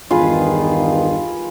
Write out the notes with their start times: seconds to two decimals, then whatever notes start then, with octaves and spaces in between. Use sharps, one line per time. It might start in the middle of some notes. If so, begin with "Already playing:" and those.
0.11 E2 G2 D#3 F4 G#4 B4